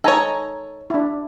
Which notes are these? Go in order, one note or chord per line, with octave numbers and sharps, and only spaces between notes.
D#4 A4 C#5 G#5 A#5
D4 E4